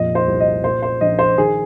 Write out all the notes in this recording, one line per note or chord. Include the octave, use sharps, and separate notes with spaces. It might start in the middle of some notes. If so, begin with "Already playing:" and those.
Already playing: F1 F2 A#2 D#5
C5
C2
D#5
A#2 C5
C5
A#1 D#5
C5
D#3 G#4